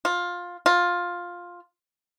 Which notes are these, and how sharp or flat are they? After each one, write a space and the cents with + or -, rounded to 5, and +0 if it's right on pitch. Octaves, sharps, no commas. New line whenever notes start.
F4 +15
F4 +10